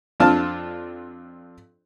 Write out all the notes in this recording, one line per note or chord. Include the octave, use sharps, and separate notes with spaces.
F2 C4 D4 F4 A5 F6